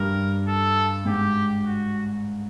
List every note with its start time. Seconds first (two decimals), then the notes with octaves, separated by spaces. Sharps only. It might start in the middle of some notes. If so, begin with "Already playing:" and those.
Already playing: G2 A#4
0.48 A4
1.05 G#2 G4
1.63 F#4